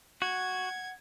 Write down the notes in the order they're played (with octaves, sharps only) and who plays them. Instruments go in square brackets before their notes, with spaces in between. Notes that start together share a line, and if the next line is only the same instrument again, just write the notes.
[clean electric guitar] F#4 [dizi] F#5 [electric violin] G#6